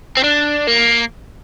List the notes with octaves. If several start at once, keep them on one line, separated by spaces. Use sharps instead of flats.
C4
D4
A#3